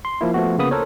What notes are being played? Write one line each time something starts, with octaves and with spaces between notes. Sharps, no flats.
C6
F3 A#3 E4
F3 A3 B3 F#4
C#3 A#3 B3 B5 D#6
A4 A#4 C5 C#5